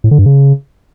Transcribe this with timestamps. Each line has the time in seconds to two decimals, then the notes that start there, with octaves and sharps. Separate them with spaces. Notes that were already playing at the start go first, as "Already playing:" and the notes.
0.04 A2
0.11 D3
0.18 G2
0.26 C#3